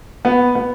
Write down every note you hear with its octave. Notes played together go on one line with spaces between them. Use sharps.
B3
B3